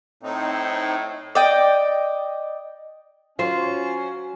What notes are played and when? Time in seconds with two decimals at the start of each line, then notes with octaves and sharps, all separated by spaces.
0.23 A2 C4 D#4
1.35 D5 D#5 G5
3.39 F#3 C#4 F4 C5